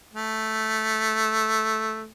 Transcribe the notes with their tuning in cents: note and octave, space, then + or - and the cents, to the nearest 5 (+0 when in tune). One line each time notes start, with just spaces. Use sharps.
A3 -5